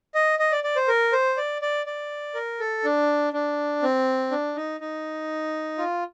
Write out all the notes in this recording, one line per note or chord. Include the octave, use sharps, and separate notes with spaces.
D#5
D#5
D5
D5
C5
A#4
C5
D5
D5
D5
A#4
A4
D4
D4
C4
D4
D#4
D#4
F4